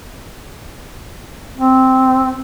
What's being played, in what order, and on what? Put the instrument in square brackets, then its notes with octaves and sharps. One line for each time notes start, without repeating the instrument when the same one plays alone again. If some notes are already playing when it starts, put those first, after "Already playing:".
[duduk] C4